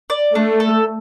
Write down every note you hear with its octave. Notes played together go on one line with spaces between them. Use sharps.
D5
A3 D4
A4